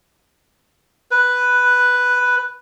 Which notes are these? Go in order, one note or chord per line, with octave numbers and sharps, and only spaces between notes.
B4